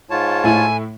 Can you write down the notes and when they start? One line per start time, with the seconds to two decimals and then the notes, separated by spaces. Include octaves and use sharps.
0.10 G#2 F4 C#5 A5
0.44 A2 E4 G#5